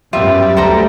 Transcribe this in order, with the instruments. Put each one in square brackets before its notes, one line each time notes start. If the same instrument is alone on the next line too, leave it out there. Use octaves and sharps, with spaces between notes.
[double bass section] F#2 [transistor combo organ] G3 [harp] B3 E5 [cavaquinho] F4
[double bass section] D2 [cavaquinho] A4 C5 A#5